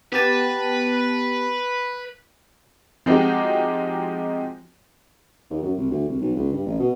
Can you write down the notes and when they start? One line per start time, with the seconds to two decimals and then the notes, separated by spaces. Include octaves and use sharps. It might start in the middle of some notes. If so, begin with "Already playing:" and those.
0.12 B3 G4 B4 A5
3.06 F3 G#3 C4 D#4 F#4 G4
5.51 D#2
5.62 F#2
5.77 C2
5.90 D2
6.08 C2
6.21 B1
6.35 C#2
6.52 G2
6.66 A1
6.79 B2